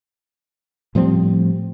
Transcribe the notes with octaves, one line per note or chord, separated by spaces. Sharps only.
A2 F3 G3 C4